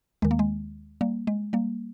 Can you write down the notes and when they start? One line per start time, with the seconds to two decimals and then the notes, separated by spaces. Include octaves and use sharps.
0.22 D#2 D#3 G#3
0.31 A#3
0.39 G#3
1.01 G3 A#3
1.27 G#3
1.53 G3 A#3